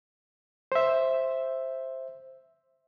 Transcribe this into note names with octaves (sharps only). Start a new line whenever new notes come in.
C5 E5